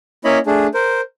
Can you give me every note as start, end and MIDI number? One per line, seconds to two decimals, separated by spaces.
0.25 0.39 58
0.25 0.39 61
0.25 0.39 64
0.25 0.39 73
0.25 0.39 75
0.25 0.39 83
0.46 0.67 57
0.46 0.67 62
0.46 0.67 68
0.74 1.01 70
0.74 1.01 72